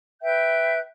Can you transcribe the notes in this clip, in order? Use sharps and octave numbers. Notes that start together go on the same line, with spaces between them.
B4 E5 G5 G6